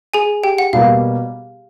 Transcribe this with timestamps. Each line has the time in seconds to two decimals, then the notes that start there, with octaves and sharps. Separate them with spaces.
0.14 G#4 G#5
0.44 G4 G5
0.58 F#5
0.73 B2 G3 A#3 F5